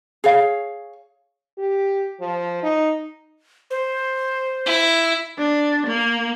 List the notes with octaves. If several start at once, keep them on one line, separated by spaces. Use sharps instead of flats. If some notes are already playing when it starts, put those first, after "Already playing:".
G#4 C#5 F5
G4
F3
D#4
C5
E4
D4
A#3